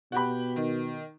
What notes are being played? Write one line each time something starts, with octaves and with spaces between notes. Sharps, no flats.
B2 F#4 G4 B5
D#3